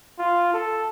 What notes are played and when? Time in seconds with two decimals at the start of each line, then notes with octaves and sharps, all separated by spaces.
0.19 F4
0.53 A4